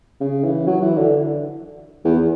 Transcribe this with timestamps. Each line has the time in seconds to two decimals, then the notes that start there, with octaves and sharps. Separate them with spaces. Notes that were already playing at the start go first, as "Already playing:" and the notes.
0.21 C#3
0.44 E3
0.67 F#3
0.81 E3
0.97 D3
2.05 E2